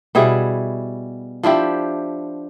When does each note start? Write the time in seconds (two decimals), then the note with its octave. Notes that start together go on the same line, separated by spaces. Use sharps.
0.15 B2 G3 E4 G#4
1.43 F3 D4 E4 G4